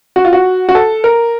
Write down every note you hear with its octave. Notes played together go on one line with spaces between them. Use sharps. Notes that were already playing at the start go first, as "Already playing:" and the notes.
F#4
F4
F#4
F#4
A4
A#4